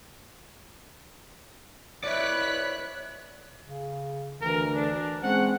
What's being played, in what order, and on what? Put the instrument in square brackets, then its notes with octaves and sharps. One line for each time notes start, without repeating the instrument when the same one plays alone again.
[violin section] E4 F#6 B6 [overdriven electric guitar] C#5 D5
[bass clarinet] C#3
[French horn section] D2 [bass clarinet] E3 [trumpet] A#4
[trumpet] D4
[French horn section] G#3 C4 [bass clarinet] C#4 [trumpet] F#5